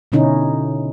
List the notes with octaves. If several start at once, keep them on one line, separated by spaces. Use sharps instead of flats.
B2 D3 C#4 D#4 E4